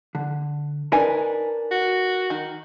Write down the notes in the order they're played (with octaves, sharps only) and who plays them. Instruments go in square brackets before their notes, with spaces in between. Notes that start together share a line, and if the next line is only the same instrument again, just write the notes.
[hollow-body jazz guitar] D3
[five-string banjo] D4 G#5 [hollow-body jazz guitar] D#4 A#4 B4
[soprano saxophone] F#4
[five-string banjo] D#3